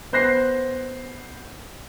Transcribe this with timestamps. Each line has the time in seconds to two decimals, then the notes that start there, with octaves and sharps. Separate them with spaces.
0.13 B3 C5 F#6 A#6 C7